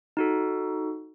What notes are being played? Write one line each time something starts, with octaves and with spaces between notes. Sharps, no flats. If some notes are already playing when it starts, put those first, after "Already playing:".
D#4 F#4 A4